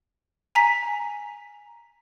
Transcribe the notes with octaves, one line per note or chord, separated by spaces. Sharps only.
G#5 A#5 B6